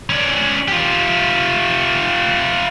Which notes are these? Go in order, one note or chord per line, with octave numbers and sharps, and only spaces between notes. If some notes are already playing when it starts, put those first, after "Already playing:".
C#4 D5
F4 G4